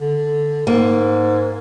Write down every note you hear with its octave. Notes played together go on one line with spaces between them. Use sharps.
D3
G#2 A#3